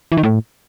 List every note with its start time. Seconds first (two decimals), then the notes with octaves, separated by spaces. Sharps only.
0.12 E3
0.17 D#3
0.23 A2